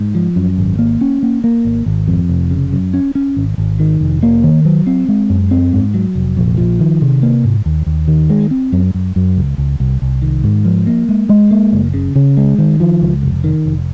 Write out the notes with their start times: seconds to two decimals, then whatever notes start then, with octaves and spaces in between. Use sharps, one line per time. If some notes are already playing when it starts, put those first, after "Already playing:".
Already playing: G#2
0.15 F3
0.36 F#2
0.58 G#1
0.79 A#3
1.01 C#4
1.23 A#3
1.44 A#3
1.65 G#1
1.86 G#1
2.07 F2
2.29 F1
2.50 C#3
2.73 F#2
2.94 C#4
3.15 C#4
3.36 G#1
3.58 G#1
3.80 D#3
4.01 F1
4.23 A#3
4.44 D#3
4.65 F#3
4.87 C4
5.08 G#3
5.30 F#2
5.51 C4
5.73 G#2
5.94 F#3
6.15 F1
6.37 A#1
6.57 F3
6.80 D#3
7.02 C3
7.23 A#3
7.44 G#2
7.66 D#2
7.86 D#2
8.08 D#3
8.30 G#3
8.51 C4
8.72 F#2
8.94 F#2
9.16 F#2
9.37 C#2
9.58 C#2
9.80 C2
10.02 C2
10.22 D#3
10.44 G#2
10.65 F3
10.87 A#3
11.09 G#3
11.29 G#3
11.51 A#3
11.72 F#1
11.94 C#3
12.15 C#3
12.37 G#3
12.58 D#3
12.80 F3
13.01 C#2
13.23 F1
13.44 D#3
13.65 F1